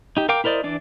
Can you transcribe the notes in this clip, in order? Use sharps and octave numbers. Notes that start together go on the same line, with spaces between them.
D#4 G4
A#4 F5 G5 D6
E4 A#4 C5 D5 D#5
E3 D4 D5